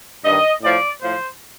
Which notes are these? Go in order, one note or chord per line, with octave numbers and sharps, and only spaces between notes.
G2 D#3 D#5
A2 F3 D5
A2 F3 C5